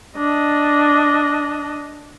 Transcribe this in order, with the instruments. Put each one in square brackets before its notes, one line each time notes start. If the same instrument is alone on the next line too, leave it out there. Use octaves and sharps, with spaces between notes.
[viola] D4 D#5